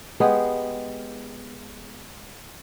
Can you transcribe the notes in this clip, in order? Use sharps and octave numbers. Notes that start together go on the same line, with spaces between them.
G#3 B3 G4 G#4